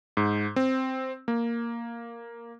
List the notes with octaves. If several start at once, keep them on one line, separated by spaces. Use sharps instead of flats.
G#2
C4
A#3